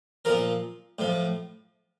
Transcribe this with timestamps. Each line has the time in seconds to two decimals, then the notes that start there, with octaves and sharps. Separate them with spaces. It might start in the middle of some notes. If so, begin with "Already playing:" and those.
0.25 A#2 F3 A#4
0.99 A2 F3